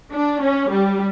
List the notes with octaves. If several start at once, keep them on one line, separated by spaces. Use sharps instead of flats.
D4
C#4
G3